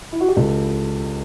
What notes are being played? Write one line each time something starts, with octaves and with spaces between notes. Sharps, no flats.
E4
F#4
G4
C#2 A4